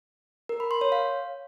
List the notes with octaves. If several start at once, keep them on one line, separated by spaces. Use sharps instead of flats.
A#4
B5
C6
C#5
F5